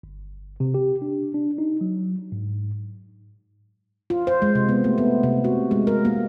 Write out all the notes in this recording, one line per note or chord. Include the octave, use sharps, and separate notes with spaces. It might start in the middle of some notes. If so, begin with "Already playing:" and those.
G1
C3
G4
D4
D4
D#4
F#3
G#2
F4
C5
G#3
C3
B3
A3
B3
C3
F#4
G#3
A#4
A#3